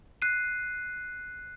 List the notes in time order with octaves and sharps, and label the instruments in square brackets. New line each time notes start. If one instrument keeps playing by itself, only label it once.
[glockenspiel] F#6 C7 D#7